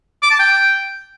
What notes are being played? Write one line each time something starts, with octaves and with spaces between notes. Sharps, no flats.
D6
A5
G5